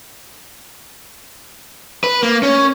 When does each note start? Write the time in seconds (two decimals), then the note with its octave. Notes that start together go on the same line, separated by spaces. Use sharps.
2.04 B4
2.23 A#3
2.43 C#4